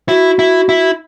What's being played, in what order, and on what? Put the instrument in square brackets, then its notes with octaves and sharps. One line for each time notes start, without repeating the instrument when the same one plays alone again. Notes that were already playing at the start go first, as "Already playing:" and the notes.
[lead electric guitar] E4 [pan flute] F#4
[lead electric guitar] E4
E4